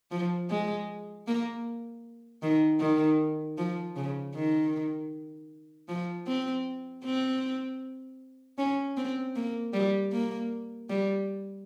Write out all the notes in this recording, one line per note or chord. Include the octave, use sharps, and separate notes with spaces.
F3
G#3
A#3
D#3
D#3
F3
C#3
D#3
F3
C4
C4
C#4
C4
A#3
G3
A#3
G3